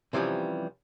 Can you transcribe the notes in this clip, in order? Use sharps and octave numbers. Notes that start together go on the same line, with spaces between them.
C3 E3 F3 G3 C#4